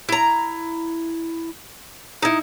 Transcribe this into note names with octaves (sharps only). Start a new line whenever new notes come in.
E4 A#5
D#4 E4